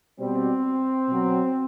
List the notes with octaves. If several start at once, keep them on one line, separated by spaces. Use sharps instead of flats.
B2 G3 C4
B2 F#3